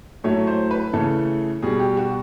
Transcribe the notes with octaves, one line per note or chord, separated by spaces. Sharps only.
A2 F#3 A3 C#5
C5
B4
C#3 E3 A3 A4
B2 G3 G#4
G4
F#4